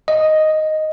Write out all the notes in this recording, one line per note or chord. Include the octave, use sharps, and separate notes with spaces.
D#5